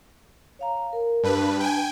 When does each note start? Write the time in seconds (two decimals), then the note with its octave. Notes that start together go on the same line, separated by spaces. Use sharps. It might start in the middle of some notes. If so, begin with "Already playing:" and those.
0.59 C#5 F5 A#5
0.93 A#4
1.24 G2 D4 B4 A5
1.60 G5 G#5